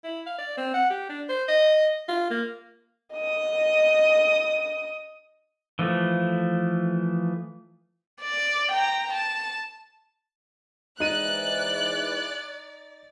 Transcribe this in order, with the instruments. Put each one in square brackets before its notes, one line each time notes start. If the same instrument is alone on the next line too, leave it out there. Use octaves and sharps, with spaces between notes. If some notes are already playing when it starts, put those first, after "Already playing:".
[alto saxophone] E4
F5
D5
C4
F#5
G4
D4
C5
D#5
F4
A#3
[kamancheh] D#5 D#6
[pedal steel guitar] E3 F3 A3
[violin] D5
G5 A#5
A5
[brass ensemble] G#2 E3 [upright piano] D#4 D#7 [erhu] D5 [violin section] F#6